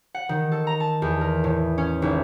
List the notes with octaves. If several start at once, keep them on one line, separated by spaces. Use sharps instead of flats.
F#5
D#3
A4
A#5
A5
E2
A#4
A2
C#4
G#1